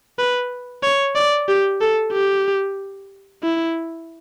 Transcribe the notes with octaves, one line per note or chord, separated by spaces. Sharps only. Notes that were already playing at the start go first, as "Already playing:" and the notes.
B4
C#5
D5
G4
A4
G4
E4